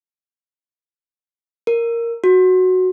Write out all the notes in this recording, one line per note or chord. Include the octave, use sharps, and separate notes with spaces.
A#4
F#4